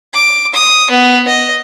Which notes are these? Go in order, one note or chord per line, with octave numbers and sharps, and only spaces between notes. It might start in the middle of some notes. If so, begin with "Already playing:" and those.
D6
D#6
B3
D#5